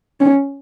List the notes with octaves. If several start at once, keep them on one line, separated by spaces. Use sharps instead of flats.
C#4